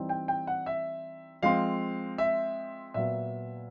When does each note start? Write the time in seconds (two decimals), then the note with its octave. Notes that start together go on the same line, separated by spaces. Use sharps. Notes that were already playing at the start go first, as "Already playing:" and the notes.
Already playing: E3 G3 C4 D#4
0.09 G5
0.28 G5
0.47 F#5
0.66 E5
1.43 F3 G#3 C4 F5
2.18 E5
2.94 A#2 F#3 B3 E5